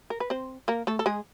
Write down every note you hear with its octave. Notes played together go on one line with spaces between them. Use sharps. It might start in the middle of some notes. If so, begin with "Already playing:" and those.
A#4
B4
C4 C5
A#3 A#4
A3 A4
A4
G#3 G#4